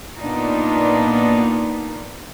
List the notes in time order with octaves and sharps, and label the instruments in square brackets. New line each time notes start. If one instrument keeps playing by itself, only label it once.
[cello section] A#2 A#3 B3 D4 D#4 F4